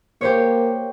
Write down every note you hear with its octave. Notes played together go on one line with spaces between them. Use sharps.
A#3 G4 C5 C#5